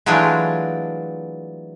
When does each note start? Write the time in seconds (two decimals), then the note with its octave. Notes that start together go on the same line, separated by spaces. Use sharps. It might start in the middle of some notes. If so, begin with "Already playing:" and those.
0.06 E3 F#3 G#3 A3 D4 F4